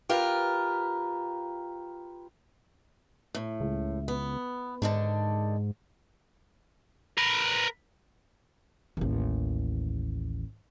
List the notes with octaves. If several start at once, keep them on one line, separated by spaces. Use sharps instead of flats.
F4 G4 A#4 B4
A2
C#2
B3
G#2 D3 D#3 D4
A#4 B4
A1 D#2